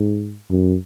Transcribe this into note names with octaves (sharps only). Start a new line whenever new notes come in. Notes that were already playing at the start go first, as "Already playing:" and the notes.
Already playing: G#2
F#2